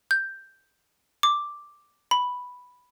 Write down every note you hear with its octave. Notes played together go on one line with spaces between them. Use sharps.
G6
D6
B5